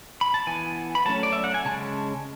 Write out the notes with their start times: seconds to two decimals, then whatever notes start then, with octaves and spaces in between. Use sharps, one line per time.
0.21 B5
0.34 A5
0.47 E3 B3 G#5
0.95 B5
1.06 F#3 A3 C#4 A5
1.23 D5
1.33 E5
1.44 F#5
1.54 G#5
1.65 C#3 G#3 C#4 A5